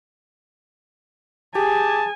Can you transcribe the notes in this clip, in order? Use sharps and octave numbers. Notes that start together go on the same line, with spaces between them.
G4 G#4 G#5 A5